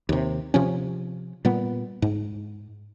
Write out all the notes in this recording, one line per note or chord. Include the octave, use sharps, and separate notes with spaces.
D#2 C3
C3 F3 C#4
A#2 G3 B3
G#2